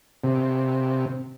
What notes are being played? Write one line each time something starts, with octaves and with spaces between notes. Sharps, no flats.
C3